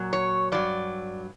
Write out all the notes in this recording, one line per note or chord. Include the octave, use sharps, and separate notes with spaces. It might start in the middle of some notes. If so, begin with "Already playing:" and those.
Already playing: A#2 F#3
C#5
G2 F#3 D5